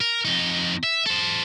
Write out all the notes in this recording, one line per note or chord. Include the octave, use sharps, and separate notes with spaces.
A#4
F2 D#4
E5
A4 C5